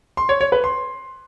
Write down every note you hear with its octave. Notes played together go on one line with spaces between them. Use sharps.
C6
C#5
C#5
B4
C6